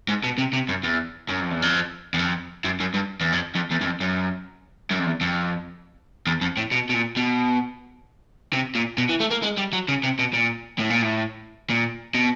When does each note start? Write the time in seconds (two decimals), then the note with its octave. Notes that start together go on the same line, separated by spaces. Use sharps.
0.08 G#2
0.23 B2
0.38 C3
0.53 C3
0.69 F#2
0.84 E2
1.29 F#2
1.40 F2
1.51 E2
1.62 F2
2.14 E2
2.19 F2
2.65 F#2
2.80 F#2
2.94 G2
3.21 E2
3.32 F2
3.55 F2
3.71 E2
3.81 F#2
3.85 F2
4.00 F#2
4.91 F#2
4.99 F2
5.06 E2
5.21 F2
6.27 E2
6.41 F2
6.57 A2
6.71 B2
6.89 B2
6.94 A#2
7.17 B2
8.53 C3
8.75 A#2
8.98 B2
9.09 E3
9.20 A3
9.31 A#3
9.43 G#3
9.58 G3
9.73 F#3
9.88 C#3
10.03 C3
10.19 B2
10.33 A#2
10.79 A2
10.90 A#2
11.02 A2
11.70 A#2
12.15 B2